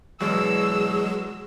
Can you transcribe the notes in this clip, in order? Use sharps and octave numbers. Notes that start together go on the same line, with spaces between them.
E2 B2 F#3 G#3 G#4 E6